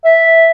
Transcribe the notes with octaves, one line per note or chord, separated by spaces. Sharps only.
E5